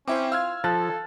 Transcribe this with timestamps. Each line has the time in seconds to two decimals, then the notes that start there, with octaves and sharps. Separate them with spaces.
0.08 C4 C#4 E4 C5 E5 G5 D6
0.32 F4 F5 E6 F6 G#6
0.64 F3 A4 F#6 A6